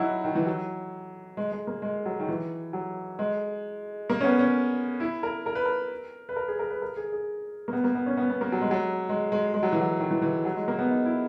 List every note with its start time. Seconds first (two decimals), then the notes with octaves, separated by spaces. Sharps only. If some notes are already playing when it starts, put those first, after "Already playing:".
Already playing: F#3 D#4 E4 F#4
0.24 D#3
0.35 E3
0.46 F#3
1.37 G#3
1.52 G#3
1.67 A#3
1.82 G#3
2.06 F#3
2.20 D#3
2.28 E3
2.73 F#3
3.19 G#3
4.10 A#3
4.21 C#4
4.24 B3
4.39 C#4
5.00 E4
5.23 A#4
5.46 A#4
5.55 B4
5.65 A#4
6.29 B4
6.36 A#4
6.48 G#4
6.59 A#4
6.70 B4
6.82 A#4
6.96 G#4
7.12 G#4
7.68 A#3
7.73 B3
7.84 A#3
7.95 B3
8.06 C#4
8.17 B3
8.30 B3
8.41 A#3
8.52 F#3
8.61 G#3
8.71 F#3
9.09 G#3
9.32 G#3
9.54 G#3
9.63 F#3
9.72 E3
9.81 F#3
10.00 D#3
10.11 E3
10.22 E3
10.45 F#3
10.56 G#3
10.68 A#3
10.79 B3
10.91 D#4
11.05 E4